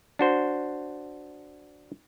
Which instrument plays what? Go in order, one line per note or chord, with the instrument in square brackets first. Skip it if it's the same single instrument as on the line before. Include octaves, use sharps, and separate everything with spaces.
[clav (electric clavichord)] D4 F#4 C5